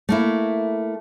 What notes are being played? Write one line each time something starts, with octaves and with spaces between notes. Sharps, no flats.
A3 A#3 E4